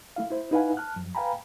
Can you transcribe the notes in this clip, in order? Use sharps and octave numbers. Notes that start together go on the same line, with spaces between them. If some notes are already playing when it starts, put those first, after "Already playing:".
A3 E4 F5
E4 C5
D#4 E4 B4 F5 F#5 G#5
A5 F6 F#6
F#2 F3
B4 F5 G5 G#5 A#5 B5